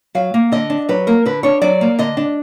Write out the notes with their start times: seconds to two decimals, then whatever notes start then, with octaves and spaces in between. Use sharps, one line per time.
0.15 F#3 F5
0.34 A#3
0.52 D3 D#5
0.70 D4
0.89 F#3 B4
1.07 A#3 A#4
1.26 D3 B4
1.43 D4 C#5
1.62 F#3 D5
1.81 A#3
1.99 D3 D#5
2.17 D4